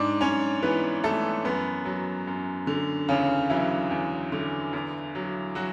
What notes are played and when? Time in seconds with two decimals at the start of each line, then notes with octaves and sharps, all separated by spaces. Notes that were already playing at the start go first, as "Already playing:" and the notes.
Already playing: G#2 D4 D5
0.21 G#2 C#4 C#5
0.62 E3 B3 B4
1.04 E3 A3 A4
1.45 F#2 B3
1.85 F#3
2.27 F#2
2.67 D3
3.09 E2 C#3 C#4
3.50 E3 F#3 E4
3.91 E2
4.32 D3
4.73 E2
5.15 F#3
5.55 F#3 F#4